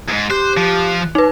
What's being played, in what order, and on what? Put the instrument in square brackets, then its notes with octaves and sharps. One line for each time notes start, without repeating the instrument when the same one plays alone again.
[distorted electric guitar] E2 G#2
[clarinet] G4 [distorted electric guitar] C5 [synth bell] F#6
[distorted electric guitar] F3
[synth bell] D#4 B4